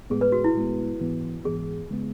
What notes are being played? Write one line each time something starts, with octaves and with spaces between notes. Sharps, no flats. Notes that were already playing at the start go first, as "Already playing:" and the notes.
A2 G#3 B3 G#4
B4
F#4
E4
A2 G#3 B3
G#2 E3 B3
G#2 E3 B3 G#4
C#3 G#3 B3